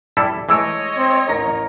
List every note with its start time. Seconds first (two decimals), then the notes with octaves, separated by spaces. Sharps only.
0.17 G3 E4 A4
0.49 E3 G#3 A3 C#5 D#5 E6 D7
0.97 C4
1.29 A1 A#4 A#6